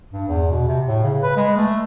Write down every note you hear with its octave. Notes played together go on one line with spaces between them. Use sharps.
G2
E2
B2
C3
A2
C#3
B4
G#3
A3